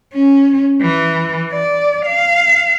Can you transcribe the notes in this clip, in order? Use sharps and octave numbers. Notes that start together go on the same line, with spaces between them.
C#4
E3
D5
F5